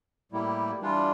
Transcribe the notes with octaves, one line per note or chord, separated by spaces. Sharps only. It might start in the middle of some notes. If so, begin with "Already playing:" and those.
A2 G3 A#3 E4 G4
E3 G3 D4 F4